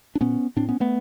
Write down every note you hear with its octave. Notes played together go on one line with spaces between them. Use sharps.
D4
A#2 B3 C#4
A2 C4 D4
B3 C#4
A3 B3